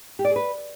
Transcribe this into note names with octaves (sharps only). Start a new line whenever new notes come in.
G4
D5
G#4
B4